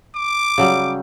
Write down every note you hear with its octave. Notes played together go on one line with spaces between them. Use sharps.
D6
C#3 F#3 G3